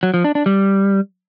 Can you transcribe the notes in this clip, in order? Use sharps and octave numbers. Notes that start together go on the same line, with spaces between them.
F#3
F3
D4
D4
G3